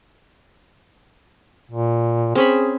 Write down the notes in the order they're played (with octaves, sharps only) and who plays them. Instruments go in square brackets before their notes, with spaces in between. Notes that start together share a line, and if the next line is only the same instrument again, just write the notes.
[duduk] A#2
[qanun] C4 C#4 B5 [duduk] G#4